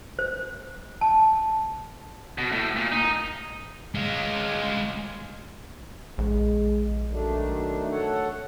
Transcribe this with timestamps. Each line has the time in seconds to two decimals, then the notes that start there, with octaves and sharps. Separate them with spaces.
0.19 C5
1.01 A5
2.38 B2
2.52 A2
2.76 A#2
2.92 D#4
3.95 G#3 F4
6.18 A#1 G#3
7.10 D#3 F#3 A3 D4
7.91 A4 C#5 F#5